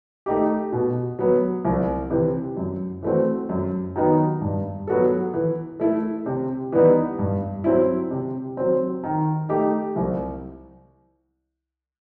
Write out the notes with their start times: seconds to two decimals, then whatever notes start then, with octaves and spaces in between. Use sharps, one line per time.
0.26 A3 D#4 G4
0.72 B2
1.19 F#3 B3
1.65 C2
2.11 C3 E3
2.57 F#2
3.03 E3 A3 C4 F#4
3.49 F#2
3.96 D#3 F#3 B3 D#4
4.41 G2
4.87 F#3 B3 F#4 A4
5.34 E3
5.80 A3 E4 A4
6.26 C3
6.72 E3 G3 B3 D#4
7.19 G2
7.64 F#3 C4 E4
8.11 C3
8.57 F#3 C4
9.04 D#3
9.49 A3 D#4 G4
9.96 C2